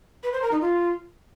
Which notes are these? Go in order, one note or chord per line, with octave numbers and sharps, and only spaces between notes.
B4
C5
A#4
D#4
F4